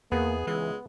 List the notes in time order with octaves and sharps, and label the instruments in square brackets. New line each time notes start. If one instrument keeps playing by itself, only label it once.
[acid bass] E2 [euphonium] A#3 [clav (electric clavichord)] B3 [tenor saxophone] G#4
[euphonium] C#2 [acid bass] E3 [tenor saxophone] G#3